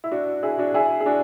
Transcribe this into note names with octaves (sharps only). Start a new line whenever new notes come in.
E4
D4 F#4
E4 G#4
D4 F#4
E4 G#4
G#4
D4 F#4